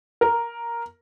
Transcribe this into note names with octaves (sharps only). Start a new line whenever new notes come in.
A#4